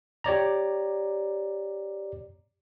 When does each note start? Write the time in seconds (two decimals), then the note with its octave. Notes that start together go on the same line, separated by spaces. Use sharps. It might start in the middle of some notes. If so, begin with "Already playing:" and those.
0.24 G4 C#5 D5 A#5